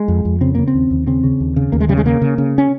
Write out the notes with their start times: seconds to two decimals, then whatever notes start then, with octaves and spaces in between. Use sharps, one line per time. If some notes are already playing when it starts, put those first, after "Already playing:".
Already playing: G#3
0.08 F2
0.25 F2
0.41 C#3 C4
0.55 C#3 A#3
0.68 C4
0.74 D#2
0.90 D#2
1.07 C#3 C4
1.24 C#3
1.40 D#2
1.56 C#3
1.72 D#2 A#3
1.80 G#3
1.89 C#3 G3
1.97 G#3
2.05 C#3 A#3
2.21 C#3
2.38 C#3
2.58 C#4